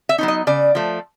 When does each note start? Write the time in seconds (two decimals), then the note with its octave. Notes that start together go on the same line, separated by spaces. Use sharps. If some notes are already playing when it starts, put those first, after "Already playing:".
0.09 E5
0.18 F#3 B3 D#4
0.28 D#5
0.47 C#3 D5
0.75 F3 A3